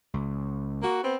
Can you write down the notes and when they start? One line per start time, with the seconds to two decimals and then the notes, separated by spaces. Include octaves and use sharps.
0.14 C#2
0.81 A#3 F#4
1.03 B3 C4